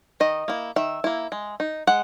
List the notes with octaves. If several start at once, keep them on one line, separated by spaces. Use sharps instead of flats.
D#3 D#5
A#3 E4
D#3 E5
A#3 E4
G#3
D#4
G#3 F#5